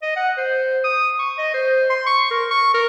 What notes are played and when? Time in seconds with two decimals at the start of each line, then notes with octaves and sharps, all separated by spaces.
0.03 D#5
0.16 F#5
0.38 C5
0.84 D#6
1.19 C#6
1.38 D#5
1.54 C5
1.90 C6
2.06 C#6
2.31 A#4
2.50 C#6
2.74 A#4